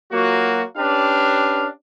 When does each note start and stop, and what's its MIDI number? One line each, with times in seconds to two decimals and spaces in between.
0.12 0.63 54
0.12 0.63 58
0.12 0.63 65
0.12 0.63 66
0.77 1.66 61
0.77 1.66 62
0.77 1.66 67
0.77 1.66 71
0.77 1.66 77